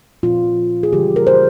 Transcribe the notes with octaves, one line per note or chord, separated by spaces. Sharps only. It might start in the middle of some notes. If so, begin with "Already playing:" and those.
A#2 F3 C4 F4
G#4
C#3 E3 G3 G4
A#4
C5